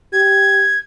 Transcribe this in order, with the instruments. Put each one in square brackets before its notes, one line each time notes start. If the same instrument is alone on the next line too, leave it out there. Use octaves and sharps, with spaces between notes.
[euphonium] G4 [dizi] G#6